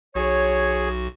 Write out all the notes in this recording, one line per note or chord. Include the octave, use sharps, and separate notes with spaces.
B1 F#4 G#4 C#5